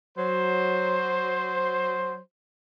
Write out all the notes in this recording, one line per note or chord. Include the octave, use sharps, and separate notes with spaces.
F#3 C5